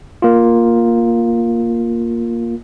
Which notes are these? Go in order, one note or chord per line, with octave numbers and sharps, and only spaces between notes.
A#3 F4